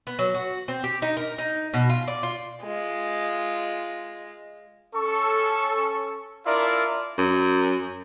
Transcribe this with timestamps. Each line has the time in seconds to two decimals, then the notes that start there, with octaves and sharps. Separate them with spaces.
0.07 B3
0.19 F#3
0.34 F#4
0.68 C4
0.84 G4
1.02 D#4
1.17 A#4
1.38 D#4
1.74 B2
1.90 F4
2.08 D5
2.23 F4
2.63 G#3 F4
4.95 C#4 A4 C#6
6.45 D4 E4 F4 A#4 D5 E5
7.18 F#2